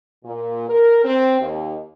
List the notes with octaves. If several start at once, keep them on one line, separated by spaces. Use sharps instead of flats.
A#2
A#4
C4
D#2